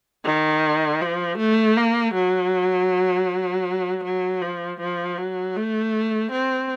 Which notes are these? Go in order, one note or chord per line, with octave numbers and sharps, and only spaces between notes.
D#3
F3
A3
A#3
F#3
F#3
F3
F3
F#3
A3
C4